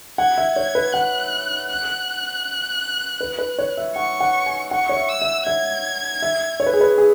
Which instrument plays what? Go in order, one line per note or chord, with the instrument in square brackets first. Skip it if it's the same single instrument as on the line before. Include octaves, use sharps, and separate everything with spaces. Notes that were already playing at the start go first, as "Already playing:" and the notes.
[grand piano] F#5 [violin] G#6
[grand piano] E5
[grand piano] C#5 [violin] G#6
[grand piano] B4
[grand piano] F#5 [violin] F#6
[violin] F#6
[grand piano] B4
B4
C#5
E5
[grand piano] F#5 [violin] C#6
[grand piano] F#5
G#5
[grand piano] F#5 [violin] C#6
[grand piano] C#5
E5
[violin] E6
[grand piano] E5
[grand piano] E5 [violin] G#6
[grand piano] E5
C#5
B4
G#4
B4
G#4